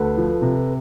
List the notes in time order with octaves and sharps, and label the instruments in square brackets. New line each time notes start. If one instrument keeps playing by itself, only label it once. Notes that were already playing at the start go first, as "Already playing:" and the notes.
Already playing: [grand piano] D2 [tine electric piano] A4 B4
[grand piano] F3
C3